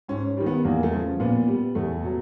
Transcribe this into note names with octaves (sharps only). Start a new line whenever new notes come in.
G#2 C#4
D#3 G3
B3
E2 A#3
A3
C#3 F3
A#2 B3
G3
E2 A3
B2 F#3